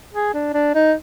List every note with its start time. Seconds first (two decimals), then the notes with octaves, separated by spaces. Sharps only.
0.14 G#4
0.34 D4
0.54 D4
0.75 D#4